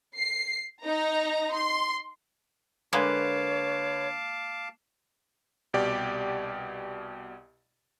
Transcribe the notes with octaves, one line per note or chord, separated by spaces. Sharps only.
C7
D#4 A#5
C6
D3 G#3 A#3 B4 C#5 F5 A5 D6
C2 B2 G4 D5